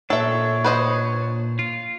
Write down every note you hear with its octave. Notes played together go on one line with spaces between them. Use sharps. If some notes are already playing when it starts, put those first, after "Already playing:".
A#2 D4 A4 C#5 E5
B4 C5 D#5
F4